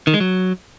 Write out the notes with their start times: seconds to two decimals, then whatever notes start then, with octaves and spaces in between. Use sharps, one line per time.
0.07 D#3
0.14 G#3
0.20 F#3